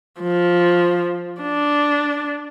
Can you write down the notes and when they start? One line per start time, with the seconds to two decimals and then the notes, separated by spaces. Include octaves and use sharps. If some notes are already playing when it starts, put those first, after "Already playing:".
0.21 F3
1.42 D4